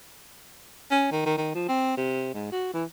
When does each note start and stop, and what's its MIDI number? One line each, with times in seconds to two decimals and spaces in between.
0.91 1.11 61
1.12 1.24 51
1.26 1.36 51
1.37 1.52 51
1.55 1.67 53
1.69 1.96 60
1.97 2.29 48
2.34 2.51 44
2.52 2.72 66
2.74 2.84 52